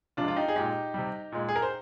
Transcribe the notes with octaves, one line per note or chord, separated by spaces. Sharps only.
C3 F3 G#3 D4 F4
F4
D#4 G4
G#4
A#2 G#3 D#4 G4
C3 G3
A#2 G#3
G#4
A#4
C5